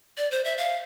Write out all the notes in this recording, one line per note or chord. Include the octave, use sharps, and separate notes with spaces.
D5
C5
E5
F5